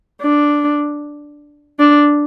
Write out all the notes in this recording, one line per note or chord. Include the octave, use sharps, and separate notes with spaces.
D4
D4